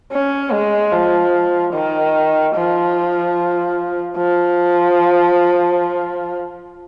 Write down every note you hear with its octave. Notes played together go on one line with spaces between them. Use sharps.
C#4
G#3
F3
D#3
F3
F3